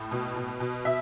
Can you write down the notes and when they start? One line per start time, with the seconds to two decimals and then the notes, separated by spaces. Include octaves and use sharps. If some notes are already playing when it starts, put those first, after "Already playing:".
Already playing: A2
0.11 B2
0.36 B2
0.60 B2
0.85 B2 E5